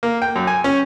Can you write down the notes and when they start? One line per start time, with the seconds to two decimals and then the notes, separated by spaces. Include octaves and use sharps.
0.03 A#3
0.22 G5
0.36 F#2
0.47 G#5
0.64 C#4